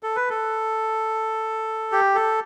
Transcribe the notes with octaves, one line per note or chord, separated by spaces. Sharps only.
A4
B4
A4
G4
A4